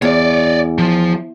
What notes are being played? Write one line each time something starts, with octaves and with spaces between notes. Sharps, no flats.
E2 C#5 D5
F3